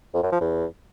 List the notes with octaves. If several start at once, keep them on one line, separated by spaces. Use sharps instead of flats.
F2
F#2
F3
E2